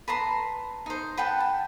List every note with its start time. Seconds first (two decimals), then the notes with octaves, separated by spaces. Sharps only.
0.08 B4 A5 A#5 C6
0.86 D#4 C5
1.17 B4 F#5 G5 A5
1.40 A5